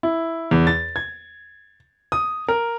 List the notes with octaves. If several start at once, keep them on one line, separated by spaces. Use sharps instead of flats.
E4
E2
A6
G#6
D#6
A#4